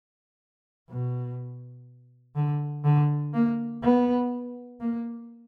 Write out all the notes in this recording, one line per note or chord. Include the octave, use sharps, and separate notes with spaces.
B2
D3
D3
A#3
B3
A#3